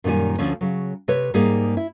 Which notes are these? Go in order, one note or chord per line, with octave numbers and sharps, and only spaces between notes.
F#2 A#2 D#3 G3 G#5
D2 D3 F3 C#4
C#3 F#3
C3 B4 C#5
G#2 G3 A#3 D#4 G#4
E4